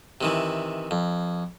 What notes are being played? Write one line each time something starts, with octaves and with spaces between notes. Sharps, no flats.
C3 D#3 E3
F2